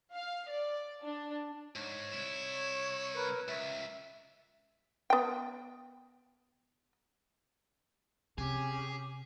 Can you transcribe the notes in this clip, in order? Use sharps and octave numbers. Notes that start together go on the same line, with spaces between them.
F5
D5
D4
G#2 C#5
C2 E4
A#4 B4
C#2 E5
B3 G5
C3 C#4 G4 G#4